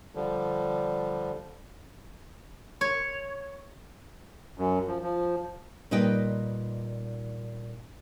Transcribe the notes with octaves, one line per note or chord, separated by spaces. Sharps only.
D3 F3 G3
C#5
F#2
F3
F3
A#2 G3 D#4 B4 D#5 G5